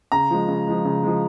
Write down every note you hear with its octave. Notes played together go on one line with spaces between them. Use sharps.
C#3 A#5
F3 G#3
C#3
F3 G#3
C#3
F3 G#3